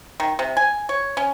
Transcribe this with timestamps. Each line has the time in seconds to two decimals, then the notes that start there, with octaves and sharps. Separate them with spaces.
0.20 D#3
0.39 C3
0.57 G#5
0.89 C#5
1.17 C#4